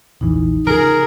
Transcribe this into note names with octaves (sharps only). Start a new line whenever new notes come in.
E1 A#1 E3 D#4
C#3 F3 G#4 A#4